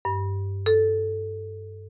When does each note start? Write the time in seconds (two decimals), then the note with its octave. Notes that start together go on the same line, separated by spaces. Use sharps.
0.05 G2
0.66 A4